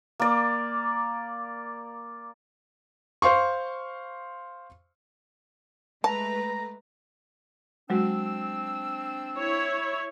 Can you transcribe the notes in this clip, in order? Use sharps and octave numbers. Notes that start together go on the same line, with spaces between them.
A#3 D5
C5 F5 C6 C#6
G#3 A3 B4 A5 A#5
F#3 G#3 C4 D4 F#4 E6
E4 C#5